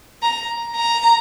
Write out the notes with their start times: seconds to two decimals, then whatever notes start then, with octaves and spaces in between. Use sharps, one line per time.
0.23 A#5
0.76 A#5